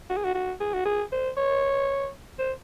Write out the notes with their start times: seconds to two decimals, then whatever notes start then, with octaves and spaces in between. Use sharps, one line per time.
0.10 F#4
0.17 G#4
0.24 F#4
0.34 F#4
0.60 G#4
0.74 F#4
0.85 G#4
1.12 C5
1.37 C#5
2.39 C5